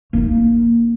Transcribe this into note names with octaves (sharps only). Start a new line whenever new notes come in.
A#3 D#4